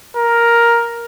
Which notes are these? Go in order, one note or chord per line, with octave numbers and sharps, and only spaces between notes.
A#4